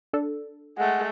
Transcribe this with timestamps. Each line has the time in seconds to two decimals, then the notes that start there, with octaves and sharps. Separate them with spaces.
0.13 D4 A4
0.78 G#3 A3 F#5